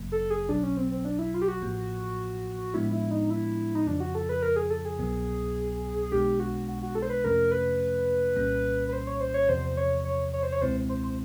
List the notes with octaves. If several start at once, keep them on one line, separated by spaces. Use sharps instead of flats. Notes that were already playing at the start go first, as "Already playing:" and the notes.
Already playing: G1 F#2 C#3 F#3 A#3
A4
G#4
B1 B2 F#3 D4
C#4
C4
C4
D4
E4
F4
G4
F#4
A1 A2 F3 A#3
A2 F3 G#3 B3 D4 E4
E4
D#4
E4
D#4
F2 C#3 F3 D4
F#4
A4
B4
A#4
G#4
A4
G#4
C2 B2 F#3 B3
B1 B2 G#3 B3 D4 G4
F#4
F#4
F#4
A4
C5
B4
F2 C3 F3 A3 C#4 A#4
B4
C2 A#2 G3 A#3 C#4
B4
C5
C#5
C5
C#5
E2 C3 F3 C5
C#5
C#5
C#5
C5
C#5
C#2 B2 G#3 C4 E4 C5
C5
C5